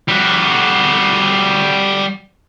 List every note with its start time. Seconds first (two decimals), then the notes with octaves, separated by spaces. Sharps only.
0.09 G3 F#4